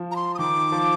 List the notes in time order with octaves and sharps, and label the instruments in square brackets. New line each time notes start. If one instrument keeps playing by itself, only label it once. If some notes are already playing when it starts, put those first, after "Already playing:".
Already playing: [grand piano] F3
[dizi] A#5
C6
D#6
[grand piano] D#3 [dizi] D6
[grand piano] F3